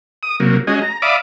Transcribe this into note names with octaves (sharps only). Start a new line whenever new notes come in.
D#6
C3 F#3 A#3
G#3 C#4 F#4 D#5 G#5
A#5
D5 E5 F5 B5 D6 D#6